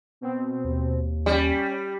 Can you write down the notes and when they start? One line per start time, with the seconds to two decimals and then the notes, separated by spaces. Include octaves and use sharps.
0.21 B2 C4
0.65 D#2
1.26 G3 C#4 G4